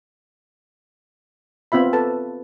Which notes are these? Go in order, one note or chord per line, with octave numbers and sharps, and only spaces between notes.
B3 C4 F4 E5 B5
A4 B4 A5